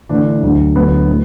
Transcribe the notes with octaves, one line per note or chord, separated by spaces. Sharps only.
A2 D3 E3 D4
D2 D3 F#3
D2 D3 F#3 B3
A2 F#3